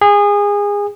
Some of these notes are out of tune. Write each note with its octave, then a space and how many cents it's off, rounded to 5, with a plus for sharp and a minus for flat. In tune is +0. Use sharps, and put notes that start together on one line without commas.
G#4 -25